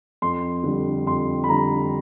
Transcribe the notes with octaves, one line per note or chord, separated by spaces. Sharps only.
F2 C6
D3 G3
F2 C6
B5
D3 G3 A#5